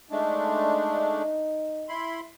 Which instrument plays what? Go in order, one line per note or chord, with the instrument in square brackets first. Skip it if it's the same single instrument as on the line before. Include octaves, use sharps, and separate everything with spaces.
[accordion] G#3 A3 D4 [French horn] D#4
[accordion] E4 B5 C6